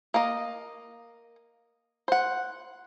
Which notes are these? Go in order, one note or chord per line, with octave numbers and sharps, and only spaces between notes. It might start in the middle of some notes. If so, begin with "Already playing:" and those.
A#3 D#5
C5 F#5